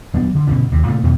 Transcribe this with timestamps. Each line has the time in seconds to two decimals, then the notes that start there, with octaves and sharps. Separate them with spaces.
0.13 D#1 F#3 B3 D4
0.35 D3
0.47 G1 B2 D3 C#4
0.72 D#2 C3
0.87 A#2 C#3 A3
1.03 E2 B2 D#3